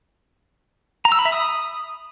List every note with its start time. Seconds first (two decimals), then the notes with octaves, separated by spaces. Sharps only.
1.05 A#5
1.12 E6
1.19 B5
1.25 E5
1.32 D#6